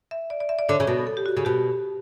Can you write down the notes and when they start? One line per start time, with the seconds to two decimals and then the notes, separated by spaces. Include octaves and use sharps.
0.11 E5
0.30 D5
0.40 D5
0.49 E5
0.59 D5
0.69 D3 C#5
0.80 C#3
0.87 B2
1.07 A4
1.17 G4
1.26 F#4
1.37 C#3
1.45 B2 G4